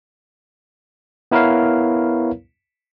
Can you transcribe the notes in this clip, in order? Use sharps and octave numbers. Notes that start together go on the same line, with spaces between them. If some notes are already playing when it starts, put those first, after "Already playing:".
B3 E4 A#4 B4 C#5 F5